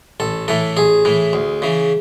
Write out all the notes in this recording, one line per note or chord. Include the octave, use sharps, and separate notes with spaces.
A1 A4
A2 E3 A4
A1 G#4
A2 E3
D2
C#3 E3